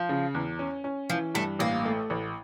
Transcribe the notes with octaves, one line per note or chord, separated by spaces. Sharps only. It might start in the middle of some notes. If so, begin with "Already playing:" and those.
Already playing: F3
C#3
E2
C#4
C#4
E3 F3
G2 A3
A1 A#3
A3
A1